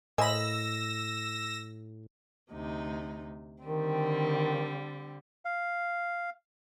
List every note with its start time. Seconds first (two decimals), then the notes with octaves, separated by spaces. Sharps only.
0.18 A2 A#3 C5 D#5 G#5 B5 E6 A#6
2.52 D2 C3 D#4
3.65 D3 D#3 G3 C4
5.45 F5